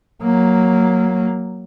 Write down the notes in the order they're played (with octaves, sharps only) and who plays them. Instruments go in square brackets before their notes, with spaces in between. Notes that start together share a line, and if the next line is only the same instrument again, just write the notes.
[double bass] F#3 A#3